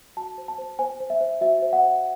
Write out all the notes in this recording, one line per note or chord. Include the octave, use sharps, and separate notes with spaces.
F#4 A5
C5
A5
C5
C5 G#5
C5
E5
C5
F#4 E5
C5
F#5
C5